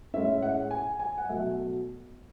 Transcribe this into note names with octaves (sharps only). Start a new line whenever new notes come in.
A2 G#3 C#4 E5
E5
F#5
G#5
G#5
F#5
B2 F#3 A3 E5